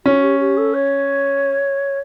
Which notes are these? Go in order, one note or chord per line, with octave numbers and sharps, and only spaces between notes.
C#4 F#4
G4
G4
A4
C#5